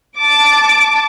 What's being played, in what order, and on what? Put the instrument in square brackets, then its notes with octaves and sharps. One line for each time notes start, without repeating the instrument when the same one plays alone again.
[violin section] A5 D6